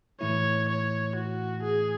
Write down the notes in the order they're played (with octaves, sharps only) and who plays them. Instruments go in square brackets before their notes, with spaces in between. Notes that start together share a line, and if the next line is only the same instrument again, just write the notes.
[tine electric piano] A2 E3 A3 E4 [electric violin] C#5
[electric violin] C#5
F#4
G#4